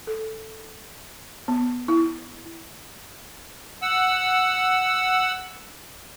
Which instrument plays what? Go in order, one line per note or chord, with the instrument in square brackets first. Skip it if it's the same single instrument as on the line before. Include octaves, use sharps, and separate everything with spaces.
[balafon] A4
B3
E4
[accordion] F#5 E6